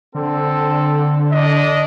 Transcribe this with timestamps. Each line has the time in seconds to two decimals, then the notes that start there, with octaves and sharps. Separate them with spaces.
0.15 D3 C4 A4
1.32 D4 D#5